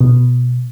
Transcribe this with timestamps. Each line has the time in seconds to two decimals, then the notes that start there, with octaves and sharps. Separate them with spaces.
0.01 B2